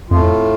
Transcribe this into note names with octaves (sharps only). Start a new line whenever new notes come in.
F2 A2 A3 F4